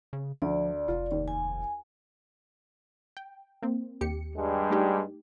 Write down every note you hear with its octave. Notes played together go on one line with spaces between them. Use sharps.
C#3
D2 F3 D5
F1 F4
D#2
G#5
G5
A#3 C4
D#2 G4 C#7
G2 G3 G#3
A3 D#4 G4